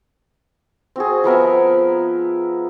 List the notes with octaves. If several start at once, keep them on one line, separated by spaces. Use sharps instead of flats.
C4 F#4 G#4
F3 B3 A#4 E5